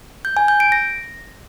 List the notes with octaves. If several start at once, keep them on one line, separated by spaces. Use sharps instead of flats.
G6
G#5
G6
D7
A#6